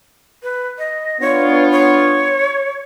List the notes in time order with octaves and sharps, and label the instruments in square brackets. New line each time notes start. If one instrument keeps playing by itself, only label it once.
[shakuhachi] B4
D#5
[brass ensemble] B3 D4 F4 [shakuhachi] C#5
[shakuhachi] C#5